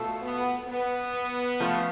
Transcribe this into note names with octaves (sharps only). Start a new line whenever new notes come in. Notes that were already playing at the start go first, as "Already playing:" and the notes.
Already playing: B2 A3 F4 A4
B3
B3
F3 A3 C#4 F4 B4